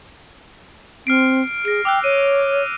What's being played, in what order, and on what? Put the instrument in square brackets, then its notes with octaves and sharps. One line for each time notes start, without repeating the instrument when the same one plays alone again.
[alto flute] C4 [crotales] F6 C7 D7
[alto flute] G#4 [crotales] A#6 D7
[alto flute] G5 [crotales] D6 E6 F#6
[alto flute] C#5 [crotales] D#7